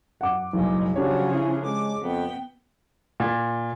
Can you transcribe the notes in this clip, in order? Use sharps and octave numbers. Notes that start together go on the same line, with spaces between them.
F#2 F#5 D6
F#1 B1 G3 G#3
C#3 F3 F#3 D4 G4 G#4 C#5
E4
G#3 D6
F2 B3 G5
A#2